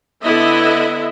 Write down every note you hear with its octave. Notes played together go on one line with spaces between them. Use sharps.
D3 B3 E4 D#5 E5